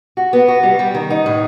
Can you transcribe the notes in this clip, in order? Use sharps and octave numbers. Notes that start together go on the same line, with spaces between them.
F#4
B3
F#4
G3
G3
D#3
D#4
A2